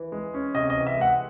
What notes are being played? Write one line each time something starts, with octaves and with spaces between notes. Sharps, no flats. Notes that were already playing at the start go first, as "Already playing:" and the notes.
Already playing: E3
G#3
C#4
C3 D#5
D#5
E3
E5
G#3 F#5